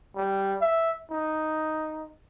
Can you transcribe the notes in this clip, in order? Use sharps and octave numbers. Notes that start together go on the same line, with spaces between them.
G3
E5
D#4